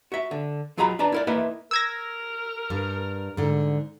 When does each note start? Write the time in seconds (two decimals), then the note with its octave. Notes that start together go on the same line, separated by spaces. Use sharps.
0.12 F#4 E5
0.31 D3
0.77 F#3 F4 G#4 D#5 A#5 B5
0.99 D4 B4 D5 A5 A#5
1.12 E4 A#4 D5
1.27 A#3 E4 A#4 B4 D#5 E5
1.71 A#4 E6 G#6 A#6
2.70 G2
3.37 G#2 D3